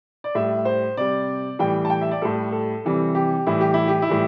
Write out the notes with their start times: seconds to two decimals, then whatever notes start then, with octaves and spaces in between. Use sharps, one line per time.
0.24 D5
0.35 A2 G3 E5
0.65 C5
0.97 C3 G3 D5
1.59 A2 E3 G3 G5
1.85 A5
1.90 G5
2.01 E5
2.11 D5
2.21 A2 G3 A4
2.52 A4
2.85 C3 E3 G3
3.15 G4
3.47 A2 E3 G3 E4
3.61 G4
3.74 E4
3.88 G4
4.02 E4
4.09 A2 E3 G3